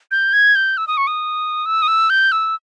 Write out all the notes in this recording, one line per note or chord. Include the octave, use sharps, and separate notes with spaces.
G6
G#6
G6
E6
D#6
C#6
D#6
E6
D#6
E6
G6
E6